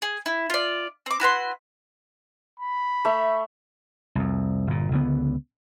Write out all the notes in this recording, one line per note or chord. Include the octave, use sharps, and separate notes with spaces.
G#4
E4
F4 D5
C4 D6
E4 F#4 B4 C6
B5
A3 E5
C2 F2
G1 A#2
C#2 D3 B3